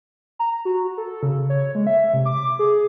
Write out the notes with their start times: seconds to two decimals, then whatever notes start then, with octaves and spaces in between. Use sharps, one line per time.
0.39 A#5
0.65 F#4
0.98 A4
1.23 C#3
1.50 C#5
1.75 G#3
1.87 E5
2.14 C3
2.26 D6
2.59 G#4